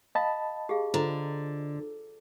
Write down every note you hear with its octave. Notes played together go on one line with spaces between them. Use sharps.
D#5 F5 A5 B5
G4 G#4 F5
D3 F4 C5 A#5